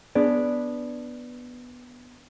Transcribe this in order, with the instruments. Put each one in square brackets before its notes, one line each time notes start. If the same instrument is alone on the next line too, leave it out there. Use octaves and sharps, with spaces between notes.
[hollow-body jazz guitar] B3 D4 G#4 D5